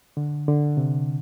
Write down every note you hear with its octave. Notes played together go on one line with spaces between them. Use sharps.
D3
D3
C3